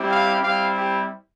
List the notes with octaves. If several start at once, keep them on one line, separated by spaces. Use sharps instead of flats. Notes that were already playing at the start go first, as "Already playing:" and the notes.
Already playing: G3 C4 E4 G4
F5
G3 C4 E4 G4 F5
G4